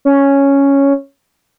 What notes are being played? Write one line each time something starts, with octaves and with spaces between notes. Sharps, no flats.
C#4